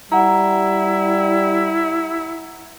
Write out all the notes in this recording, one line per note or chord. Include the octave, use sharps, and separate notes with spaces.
G3 E4 F#5 A#5